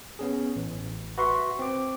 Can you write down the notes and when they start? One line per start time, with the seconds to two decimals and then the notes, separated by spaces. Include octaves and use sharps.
0.19 B3 C#4 G#4
0.56 A1
1.18 F#4 B4 E5 C6 C#6
1.59 C4 D6